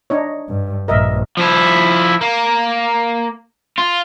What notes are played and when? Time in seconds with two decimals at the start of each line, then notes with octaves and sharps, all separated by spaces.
0.10 D4 D#4 C#5
0.49 G2
0.88 A#1 G2 A#4 D#5 E5
1.37 F3 E4
2.21 A#3
3.78 F4